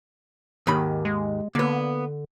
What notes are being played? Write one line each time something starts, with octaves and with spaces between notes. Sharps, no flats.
D#2 G#2 D#3 B5
G#3
D3 A#3 B3